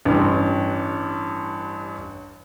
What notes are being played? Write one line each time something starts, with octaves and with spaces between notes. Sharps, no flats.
A1 G2